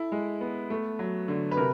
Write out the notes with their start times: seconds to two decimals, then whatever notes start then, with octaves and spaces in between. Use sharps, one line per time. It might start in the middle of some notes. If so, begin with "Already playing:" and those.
Already playing: E4 A4
0.12 G#3
0.41 B3
0.70 A3
0.99 F#3
1.28 D3
1.51 B4
1.57 C3 A#4